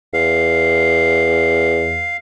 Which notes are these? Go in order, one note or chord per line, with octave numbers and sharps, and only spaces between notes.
E2 F5